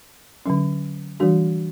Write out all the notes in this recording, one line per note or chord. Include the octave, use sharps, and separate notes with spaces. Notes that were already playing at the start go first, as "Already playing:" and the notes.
D3 F#3 C#4
E3 G3 D4 F#4